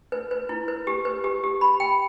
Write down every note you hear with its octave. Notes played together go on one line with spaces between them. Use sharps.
B4
B4
E4
B4
G4
B4
G4
G4
B5
G5